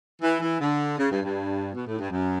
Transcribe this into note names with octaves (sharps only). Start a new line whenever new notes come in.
E3
E3
D3
C#3
G2
G2
B2
A2
G2
F#2